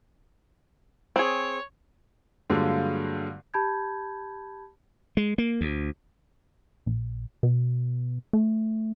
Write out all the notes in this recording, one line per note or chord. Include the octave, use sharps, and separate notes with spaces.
C4 G#4 C#5
G2 D3 F#3 G#3 A#3 F4
G4 A5 B5 G6 G#6
G#3
A#3
D2
A#1
B2
A3